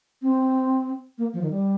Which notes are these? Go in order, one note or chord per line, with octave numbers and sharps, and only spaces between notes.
C4
A#3
F3
D#3
G3